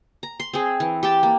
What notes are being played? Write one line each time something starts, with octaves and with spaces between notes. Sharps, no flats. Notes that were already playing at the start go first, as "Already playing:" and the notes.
A#5
C6
C4 G#4
E3
G4 G5 A5
A#3